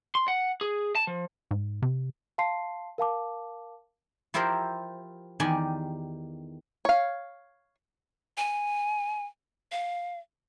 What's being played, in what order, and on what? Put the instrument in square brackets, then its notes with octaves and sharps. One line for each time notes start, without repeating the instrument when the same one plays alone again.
[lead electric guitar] C6
F#5
G#4
A5
F3
[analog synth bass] G#2
C3
[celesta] F5 A5 C6 C7
A#4 F5 A5 D6
[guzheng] F3 E4 F4 G4 A#4 C5
E2 D#3 G4 D5 G#5
[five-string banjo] C#5 F5
[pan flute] G#5
F5